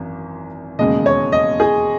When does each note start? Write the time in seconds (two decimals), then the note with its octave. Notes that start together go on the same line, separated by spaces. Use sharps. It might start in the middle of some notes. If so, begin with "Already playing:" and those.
Already playing: G#1 F#2 E3
0.79 E1 D#2 C#3 G#3 D#5
1.06 C#5
1.32 D#5
1.60 G#4